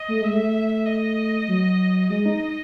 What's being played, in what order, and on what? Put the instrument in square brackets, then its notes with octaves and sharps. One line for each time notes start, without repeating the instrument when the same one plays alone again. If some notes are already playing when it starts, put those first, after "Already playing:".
Already playing: [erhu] D#5
[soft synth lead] A3
[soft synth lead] G#3 [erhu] E5
[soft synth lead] A3
[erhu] D#5
[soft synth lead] F#3
[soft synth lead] G#3 [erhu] D#5
[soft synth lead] D#4